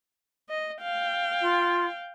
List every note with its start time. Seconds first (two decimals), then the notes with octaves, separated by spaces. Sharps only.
0.49 D#5
0.82 F5 G5
1.41 F4